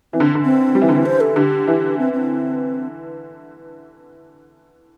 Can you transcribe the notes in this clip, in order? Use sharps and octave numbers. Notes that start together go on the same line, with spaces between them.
E3 C4
D3
D3
C4
G3
E3
D3
E3
C5
A4
D3 G4
E3
C4
C4